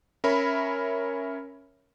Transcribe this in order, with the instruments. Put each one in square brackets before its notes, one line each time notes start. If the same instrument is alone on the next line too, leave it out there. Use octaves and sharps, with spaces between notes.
[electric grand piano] C#4 A#4 C#5 E5 B5